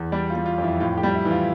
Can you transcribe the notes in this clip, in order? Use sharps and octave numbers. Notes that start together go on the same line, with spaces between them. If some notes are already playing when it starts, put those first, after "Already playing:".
Already playing: E2
G3 D5
F4
G3
F4
F2
E4
A2 F4
G4
G3
E4
E3
F4